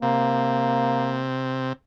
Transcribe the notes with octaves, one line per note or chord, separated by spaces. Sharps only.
C3 A#3